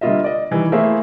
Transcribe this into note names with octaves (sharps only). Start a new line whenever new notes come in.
D3 G3 A#3 F4 D#5 E5
D5 D#5
D#3 E3 G3
A3 A#3 E4 G#4 C5 E5